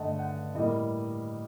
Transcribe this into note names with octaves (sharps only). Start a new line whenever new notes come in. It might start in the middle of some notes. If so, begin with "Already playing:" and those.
Already playing: G2 D3 A3 D#5 F#5 A5
F#5
A2 G3 A#3 D#5